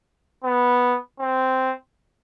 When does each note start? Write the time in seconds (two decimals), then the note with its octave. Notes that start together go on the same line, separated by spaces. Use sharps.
0.44 B3
1.20 C4